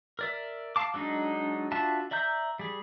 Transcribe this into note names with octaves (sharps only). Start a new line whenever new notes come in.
A#4 D5 E5
F5 A5 D6
F#3 G#3 D4 D#4
D4 F4 F#4 E5 A5
D5 E5 A#5 G6
G3 G#4